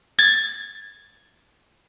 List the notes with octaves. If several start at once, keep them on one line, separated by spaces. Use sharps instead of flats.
G#6 A6